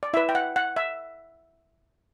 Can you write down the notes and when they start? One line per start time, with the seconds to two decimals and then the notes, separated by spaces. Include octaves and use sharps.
0.03 D5
0.14 E4 E5
0.17 B4
0.29 G5
0.35 F#5
0.56 F#5
0.76 E5